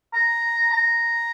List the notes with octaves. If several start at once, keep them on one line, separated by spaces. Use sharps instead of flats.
A#5
A#5